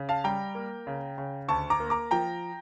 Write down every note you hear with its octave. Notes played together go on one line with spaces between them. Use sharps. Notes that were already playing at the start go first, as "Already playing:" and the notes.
Already playing: C#3
F5 A5
G3 G5 A#5
A#3
C#3
C#3
D2 A5 C#6
A#5 D6
A#3
A#5 D6
F3 G5 A#5